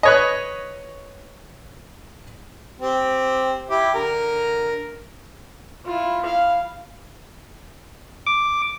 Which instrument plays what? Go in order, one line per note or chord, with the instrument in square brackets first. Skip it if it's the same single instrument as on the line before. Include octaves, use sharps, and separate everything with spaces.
[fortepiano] B4 C#5 D#5
[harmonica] C4 G4
E4 G4
D3 A#4
[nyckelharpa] E4 F4
E4 F5
[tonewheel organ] D6